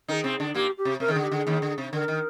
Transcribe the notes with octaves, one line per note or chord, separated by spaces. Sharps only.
D#3 D#4 G#4 A#4
C3 C4
D3 D4
A#2 A#3 G4
G4
C3
C3 A#4
D#3
D3 G#4
G4
D3 G#4
D#2 D#3
D3
C3
D3 A#4
D#3